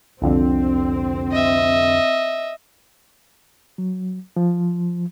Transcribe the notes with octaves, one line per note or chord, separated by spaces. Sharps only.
C2 F2 D3 C4
D#5 E5
F#3
F3